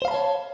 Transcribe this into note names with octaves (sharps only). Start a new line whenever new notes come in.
C5 C#5 F5 A5 B5